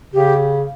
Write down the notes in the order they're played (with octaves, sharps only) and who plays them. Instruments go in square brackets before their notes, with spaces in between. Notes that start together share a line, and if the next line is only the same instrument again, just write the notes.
[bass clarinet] C#3 [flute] G4